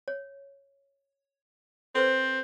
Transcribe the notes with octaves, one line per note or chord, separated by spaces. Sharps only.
C#5
C4 A4 B4 C5